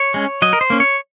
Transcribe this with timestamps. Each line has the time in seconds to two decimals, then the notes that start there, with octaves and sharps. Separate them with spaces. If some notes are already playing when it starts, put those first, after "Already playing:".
Already playing: C#5
0.14 G#3 C#4
0.42 F#3 D#5
0.53 A#4
0.61 C5
0.70 A#3 C#4
0.80 C#5